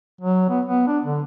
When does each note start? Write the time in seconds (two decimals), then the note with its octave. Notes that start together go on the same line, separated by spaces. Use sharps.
0.21 F#3
0.49 B3
0.65 B3
0.87 D4
1.05 D3